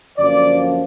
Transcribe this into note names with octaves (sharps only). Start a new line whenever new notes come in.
F#2 D3 F3 A#3 D5